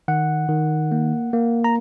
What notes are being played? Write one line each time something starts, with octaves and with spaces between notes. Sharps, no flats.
D#3 F#5
D#3
A#3
A#3
A#5